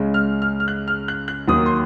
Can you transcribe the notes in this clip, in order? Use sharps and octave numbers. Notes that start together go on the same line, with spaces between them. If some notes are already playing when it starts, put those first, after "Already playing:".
Already playing: C#2 C#3 G#3
F6
F6
F6
F#6
F6
F#6
F#6
D#2 D#3 F#3 A#3 D#6
C6